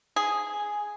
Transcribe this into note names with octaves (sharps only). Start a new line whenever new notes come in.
G#4